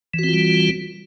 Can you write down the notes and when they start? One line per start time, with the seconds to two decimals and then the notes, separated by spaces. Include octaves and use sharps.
0.14 E3
0.19 F#4
0.24 C4
0.29 F4
0.33 G3